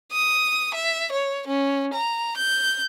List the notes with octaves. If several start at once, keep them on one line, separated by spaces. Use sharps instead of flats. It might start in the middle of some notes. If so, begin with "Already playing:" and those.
D#6
E5
C#5
C#4
A#5
G6